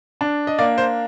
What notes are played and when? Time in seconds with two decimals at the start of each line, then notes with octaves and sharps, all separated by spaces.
0.21 D4
0.47 D#5
0.59 A#3 D5
0.78 C5